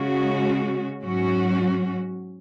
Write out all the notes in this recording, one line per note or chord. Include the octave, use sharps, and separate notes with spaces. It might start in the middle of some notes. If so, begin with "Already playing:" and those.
Already playing: C#3 G#3 C#4 F#4
G#2 F#3 C#4 F#4